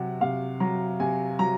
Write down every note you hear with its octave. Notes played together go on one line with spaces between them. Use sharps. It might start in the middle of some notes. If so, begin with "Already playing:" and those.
Already playing: C3 F#3 F#5
C3 F5
F#3 A#5
C3 G#5
F#3 A#5